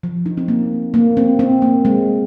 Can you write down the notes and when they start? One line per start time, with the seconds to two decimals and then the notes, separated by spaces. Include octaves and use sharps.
0.03 F3
0.26 D#4
0.37 C4
0.48 A#3
0.94 A#3
1.17 C4
1.39 C4
1.62 A#3
1.85 G#3